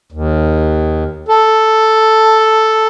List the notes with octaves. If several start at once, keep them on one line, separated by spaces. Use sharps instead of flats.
D#2
A4